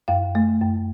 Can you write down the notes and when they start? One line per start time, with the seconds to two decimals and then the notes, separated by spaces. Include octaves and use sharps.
0.08 F#2 F5
0.35 A3
0.61 F#2